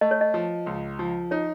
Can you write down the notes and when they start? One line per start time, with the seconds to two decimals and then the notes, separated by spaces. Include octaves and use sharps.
0.01 A3 D#5
0.11 C#5
0.21 D#5
0.34 F3
0.66 C#2
0.99 F3
1.31 D#4 C#5